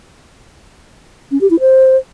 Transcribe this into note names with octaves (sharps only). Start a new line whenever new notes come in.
C#4
G4
E4
C5